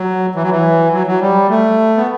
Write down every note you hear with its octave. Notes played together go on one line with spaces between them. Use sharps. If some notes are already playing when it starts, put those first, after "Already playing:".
Already playing: F#3
E3
F#3
E3
F#3
F#3
G3
A3
B3